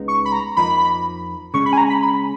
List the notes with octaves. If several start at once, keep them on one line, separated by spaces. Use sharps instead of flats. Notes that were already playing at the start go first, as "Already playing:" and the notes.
Already playing: C#2 C#3 G#3 B3 D#4
C#6
B5
A#5
F2 F3 A#3 D#4 B5
C#3 G#3 C#4 C#6
B5
G#5
A#5
B5
B5